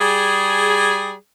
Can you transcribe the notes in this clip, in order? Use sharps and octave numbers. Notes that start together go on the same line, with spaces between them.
G3 G#4